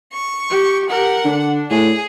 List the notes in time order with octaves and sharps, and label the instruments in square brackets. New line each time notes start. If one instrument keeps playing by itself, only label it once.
[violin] C#6
[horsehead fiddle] G4
[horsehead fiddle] G4 A#4 [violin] F#5
[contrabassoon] D3 [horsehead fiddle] D4
[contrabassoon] A2 [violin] G#4